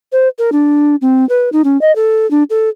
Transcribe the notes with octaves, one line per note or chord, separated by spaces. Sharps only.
C5
A#4
D4
C4
B4
D#4
C#4
D#5
A4
D4
A4